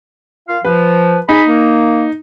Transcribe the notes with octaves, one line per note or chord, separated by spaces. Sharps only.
A#2 F4 F5
F3 B4
D#4 G#4 B5
A#3